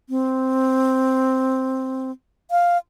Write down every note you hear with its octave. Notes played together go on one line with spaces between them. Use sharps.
C4
F5